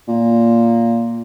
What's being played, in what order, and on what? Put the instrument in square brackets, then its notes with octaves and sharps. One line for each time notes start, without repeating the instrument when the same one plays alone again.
[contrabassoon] A#2